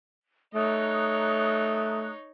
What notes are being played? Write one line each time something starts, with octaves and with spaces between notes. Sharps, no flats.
A3 D#4 C#5 A#5 D#6 F#6